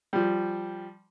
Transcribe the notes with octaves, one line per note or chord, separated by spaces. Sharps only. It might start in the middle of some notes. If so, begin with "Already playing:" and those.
F3 G3